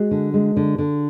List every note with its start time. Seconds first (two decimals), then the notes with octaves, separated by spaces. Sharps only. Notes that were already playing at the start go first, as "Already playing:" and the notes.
Already playing: G#3 F#4 G#4
0.11 D3
0.34 G#3
0.57 D3
0.78 D3